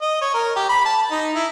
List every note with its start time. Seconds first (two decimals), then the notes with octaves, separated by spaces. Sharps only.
0.01 D#5
0.21 C#5
0.34 A#4
0.56 G4
0.69 B5
0.85 A5
1.11 D#4
1.35 E4